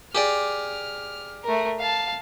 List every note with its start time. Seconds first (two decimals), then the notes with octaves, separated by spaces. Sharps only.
0.15 G4 G#4 D5 F6
1.44 A3 A#4
1.79 F5 A5